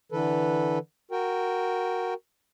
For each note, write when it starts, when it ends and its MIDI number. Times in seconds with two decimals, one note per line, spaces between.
0.12 0.78 50
0.12 0.78 52
0.12 0.78 69
0.12 0.78 71
1.11 2.14 66
1.11 2.14 70
1.11 2.14 79